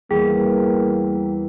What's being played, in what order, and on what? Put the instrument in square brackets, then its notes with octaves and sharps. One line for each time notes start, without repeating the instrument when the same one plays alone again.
[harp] E2 [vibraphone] G3 [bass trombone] A#3 [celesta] G#4